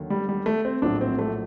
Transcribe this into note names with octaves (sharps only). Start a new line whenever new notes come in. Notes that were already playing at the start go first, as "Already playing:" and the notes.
Already playing: D#2 D3 F#3
G3
G3
A3
C4
A#1 A2 F#3 D4
C4
A3